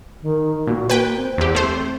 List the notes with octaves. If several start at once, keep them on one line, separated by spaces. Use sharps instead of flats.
D#3
A#2 F#4
A#3 B4 G5
C4
E2 G4
A3 C5